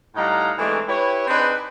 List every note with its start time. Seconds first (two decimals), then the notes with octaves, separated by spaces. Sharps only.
0.15 A2 G3 D#4 F5 F#5 A#5
0.58 E3 G#3 A3 C4 D4 D#4
0.88 E4 G4 B4 C#5
1.27 C4 D4 D#4 G#4 B4